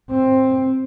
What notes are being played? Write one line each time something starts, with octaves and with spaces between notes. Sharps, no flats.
C4